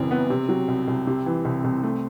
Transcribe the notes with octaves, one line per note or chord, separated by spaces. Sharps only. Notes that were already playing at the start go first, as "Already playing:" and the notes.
Already playing: F#1 F#2 E3 C4
B3
C3
F#3
C2
C2
C3
E3
C2
C2
A3